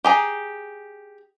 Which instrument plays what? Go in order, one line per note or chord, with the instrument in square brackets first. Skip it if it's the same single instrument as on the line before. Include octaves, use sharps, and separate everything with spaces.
[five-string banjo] G4 G#4 A#5